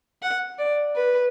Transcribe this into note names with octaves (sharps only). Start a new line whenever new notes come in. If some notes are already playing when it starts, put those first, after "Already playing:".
F#5
D5
B4